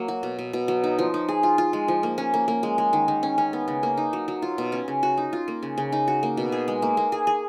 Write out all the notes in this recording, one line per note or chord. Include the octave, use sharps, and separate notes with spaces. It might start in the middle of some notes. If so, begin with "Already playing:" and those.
Already playing: F#3 A#3
F#4
B2
B2
B2
F#3
D#4
F3
D#4
G#4
F4
F4
G#3
F3
A#3
C#4
A#3
A#3
G#3
G#3
D#3
D#3
C#4
C#4
B3
C#3
A#3
D#4
F#3
F#3
F4
B2
C#4
C#3
F#4
D#4
F4
A#3
C#3
C#3
D#4
F#4
A#3
B2
G#4
G#3
A#3
A#3
G#4
G#4